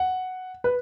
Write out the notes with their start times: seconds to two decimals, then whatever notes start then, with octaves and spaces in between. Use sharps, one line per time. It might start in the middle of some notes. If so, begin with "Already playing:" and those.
Already playing: F#5
0.64 B4